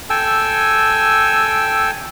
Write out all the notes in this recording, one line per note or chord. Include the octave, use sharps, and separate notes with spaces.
A4 G5 G#5 E6